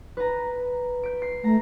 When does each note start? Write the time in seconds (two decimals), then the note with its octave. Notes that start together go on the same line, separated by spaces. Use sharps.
0.17 B4 A#5
1.03 G6 B6 D7
1.22 C7
1.44 A3 A#5